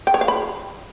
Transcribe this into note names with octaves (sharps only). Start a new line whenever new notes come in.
G5
C#5
F5
B5